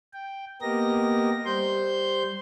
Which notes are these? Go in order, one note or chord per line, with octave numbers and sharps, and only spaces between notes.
G5
A#3 B3 G4 A#4 D#5 A#6
G3 C5 C6 G6